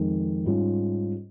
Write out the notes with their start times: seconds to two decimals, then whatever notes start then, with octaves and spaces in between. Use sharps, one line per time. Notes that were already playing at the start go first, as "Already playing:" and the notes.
Already playing: F2 D#3 G#3
0.45 G#2 G3 C#4 F4